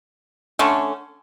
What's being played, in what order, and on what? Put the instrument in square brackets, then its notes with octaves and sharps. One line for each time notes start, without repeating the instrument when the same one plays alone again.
[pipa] D3 A3 C#4